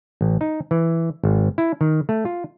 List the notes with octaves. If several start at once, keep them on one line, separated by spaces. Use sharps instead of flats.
A1
D#4
E3
G#1
E4
D#3
A3
F4